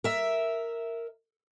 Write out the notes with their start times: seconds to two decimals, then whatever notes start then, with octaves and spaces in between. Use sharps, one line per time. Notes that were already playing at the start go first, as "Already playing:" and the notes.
0.04 A#4 E5